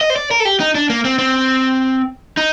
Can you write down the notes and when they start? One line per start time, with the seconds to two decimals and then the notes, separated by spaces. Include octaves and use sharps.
0.01 D#5
0.10 C5
0.16 D5
0.31 A#4
0.40 A4
0.45 G4
0.60 D#4
0.75 D4
0.90 A#3
1.05 C4
1.19 C4
2.37 D#4